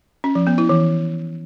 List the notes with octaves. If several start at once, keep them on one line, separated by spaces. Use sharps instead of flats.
C#4
F3
B3
E4
E3